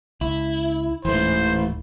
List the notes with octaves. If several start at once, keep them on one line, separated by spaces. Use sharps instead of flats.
C#2 E4
D1 G#2 E3 A3 C5